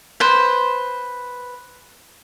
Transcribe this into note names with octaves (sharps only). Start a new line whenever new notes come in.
B4 C5